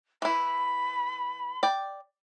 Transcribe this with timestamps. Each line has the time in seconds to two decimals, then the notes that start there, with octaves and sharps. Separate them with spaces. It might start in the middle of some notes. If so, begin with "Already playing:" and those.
0.22 E3 E4 B5
1.63 D5 G5